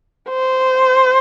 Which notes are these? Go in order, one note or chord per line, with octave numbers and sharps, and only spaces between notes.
C5